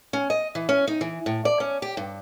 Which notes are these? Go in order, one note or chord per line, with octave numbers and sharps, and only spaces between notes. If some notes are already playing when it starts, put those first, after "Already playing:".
C#4
D#5
E3
C#4
D#4
E3
A2
D5
C#4
G4
G2